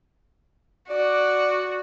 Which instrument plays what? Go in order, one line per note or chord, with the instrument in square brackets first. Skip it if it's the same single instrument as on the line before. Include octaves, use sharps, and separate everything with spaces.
[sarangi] F#4 [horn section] D5